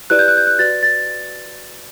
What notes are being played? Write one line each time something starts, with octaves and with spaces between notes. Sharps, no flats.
E4 G4 B4 D5 F#6
G6
F#6
G6
F#6
F#4 B4 D5 A6
A6